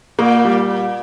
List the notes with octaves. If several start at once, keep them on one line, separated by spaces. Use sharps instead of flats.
A#2 A#3
G3